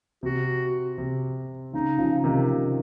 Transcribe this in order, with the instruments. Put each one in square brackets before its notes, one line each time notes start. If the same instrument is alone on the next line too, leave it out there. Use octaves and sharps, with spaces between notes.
[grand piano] C3 [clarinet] F#4
[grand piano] C3
[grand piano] C#3 [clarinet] D#4
[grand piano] C#3 F3
C3 D#3
C3